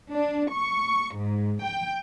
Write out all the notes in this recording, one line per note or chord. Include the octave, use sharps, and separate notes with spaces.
D4
C#6
G#2
G5